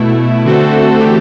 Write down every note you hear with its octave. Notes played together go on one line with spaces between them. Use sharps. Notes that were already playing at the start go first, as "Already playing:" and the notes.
Already playing: B2 A3 E4
D3 A3 C4 F#4 A4
E3 A3 C4 G4